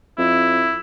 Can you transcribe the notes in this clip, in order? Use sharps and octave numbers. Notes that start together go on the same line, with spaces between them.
F2 E4